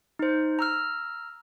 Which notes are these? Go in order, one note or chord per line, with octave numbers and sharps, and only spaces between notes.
D#4 C5
A#5 E6 F6